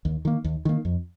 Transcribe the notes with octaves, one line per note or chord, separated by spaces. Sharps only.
D#2
D#3 A#3
D#2
D#3 A#3
F2